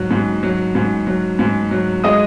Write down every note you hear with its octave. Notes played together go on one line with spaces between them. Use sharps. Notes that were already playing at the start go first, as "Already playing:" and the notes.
Already playing: G#2 F#3
G#2
F#3
G#2
F#3
G#2
F#3
G#3 D#5 D#6